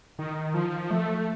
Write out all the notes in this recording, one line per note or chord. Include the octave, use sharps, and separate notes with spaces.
D#3
F3
A3